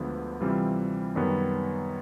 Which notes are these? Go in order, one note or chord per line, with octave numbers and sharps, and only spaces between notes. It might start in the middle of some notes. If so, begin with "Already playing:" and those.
Already playing: D2 D3 F3 G#3 B3
C3 E3 G3 C4 F4
F#2 D#3 G3 B3